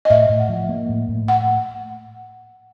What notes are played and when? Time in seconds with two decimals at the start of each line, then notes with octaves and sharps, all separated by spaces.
0.05 D#5
0.10 A2 E5
0.29 A2
0.39 F#5
0.49 F3
0.69 A#3
0.89 A2
1.09 A2
1.28 F#5